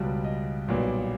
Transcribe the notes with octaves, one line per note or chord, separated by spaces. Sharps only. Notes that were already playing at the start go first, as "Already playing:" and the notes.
Already playing: C#2 B2 G3
D#5
B1 A#2 G3 B3 D5